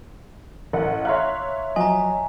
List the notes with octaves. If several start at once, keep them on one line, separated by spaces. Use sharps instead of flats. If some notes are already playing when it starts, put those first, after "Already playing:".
A1 F#5
C#5 E5 F5 A#5 C6 F#6
F3 F#3 D#5 G#5 A#5